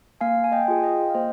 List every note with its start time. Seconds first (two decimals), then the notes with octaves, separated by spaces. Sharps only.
0.21 A#3 F5 G#5
0.44 G#5
0.52 D#5 G5
0.68 F4 G#4
0.83 D#5 G5
1.10 F5
1.14 A#3 C5 D#5